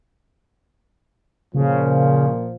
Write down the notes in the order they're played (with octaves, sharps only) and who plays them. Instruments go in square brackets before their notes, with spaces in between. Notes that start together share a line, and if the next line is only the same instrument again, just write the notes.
[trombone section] A#2 F3 [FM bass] C#3